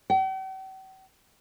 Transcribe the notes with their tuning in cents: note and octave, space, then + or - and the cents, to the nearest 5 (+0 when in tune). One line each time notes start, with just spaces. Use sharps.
G5 -45